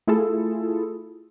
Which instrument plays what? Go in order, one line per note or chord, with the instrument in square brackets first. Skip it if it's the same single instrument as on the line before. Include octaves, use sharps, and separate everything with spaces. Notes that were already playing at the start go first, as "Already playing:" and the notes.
[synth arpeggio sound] A3 E4 F4 G#4 A4